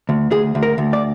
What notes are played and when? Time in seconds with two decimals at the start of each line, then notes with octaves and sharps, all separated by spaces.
0.09 D2
0.31 D2 G#4
0.55 D2
0.63 A#4
0.78 D2
0.93 D5